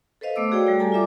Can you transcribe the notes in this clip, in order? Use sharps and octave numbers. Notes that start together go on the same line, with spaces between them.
A4 B4 C5 D#5 F5
A3 B3 D6 E6
F#4 G#4 A4 C#5 D5 G5
G3 A3 G5
G4 A4 G#5 A#5
F4 D5 E5 D6